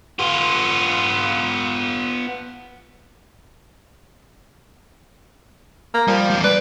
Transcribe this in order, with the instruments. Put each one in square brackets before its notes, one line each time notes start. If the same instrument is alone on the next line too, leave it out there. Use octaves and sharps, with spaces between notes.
[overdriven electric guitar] B3 F4
[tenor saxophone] A#3
[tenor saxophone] F3 [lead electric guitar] G3
[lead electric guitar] E2 G3
[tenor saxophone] B4 [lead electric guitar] D5